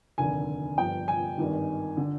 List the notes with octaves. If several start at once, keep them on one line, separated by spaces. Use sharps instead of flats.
F1 D#2 D3 G#5
G1 G2 F3 G5
G#5
G#1 G2 D#3
D3